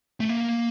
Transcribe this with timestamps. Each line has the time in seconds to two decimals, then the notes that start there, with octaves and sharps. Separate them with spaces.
0.20 A3
0.29 A#3